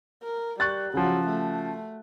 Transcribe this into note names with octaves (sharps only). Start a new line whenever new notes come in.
A#4
G3 C#6 F#6 A6
C#3 F3 F#3
A3